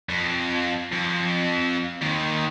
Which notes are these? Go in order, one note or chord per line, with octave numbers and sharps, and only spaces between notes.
F2
F2
D#2 D#3